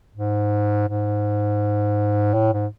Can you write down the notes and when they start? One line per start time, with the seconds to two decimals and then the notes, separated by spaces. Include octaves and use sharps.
0.15 G#2
0.88 G#2
2.34 A2
2.53 G#2